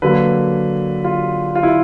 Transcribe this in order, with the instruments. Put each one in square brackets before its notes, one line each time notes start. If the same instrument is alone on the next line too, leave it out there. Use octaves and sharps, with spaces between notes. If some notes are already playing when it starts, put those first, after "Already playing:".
[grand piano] D3 F#3 A#3 B4
F4
F4
E4